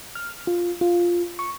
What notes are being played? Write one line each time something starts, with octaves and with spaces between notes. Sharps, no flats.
F6
F4
F4
C#6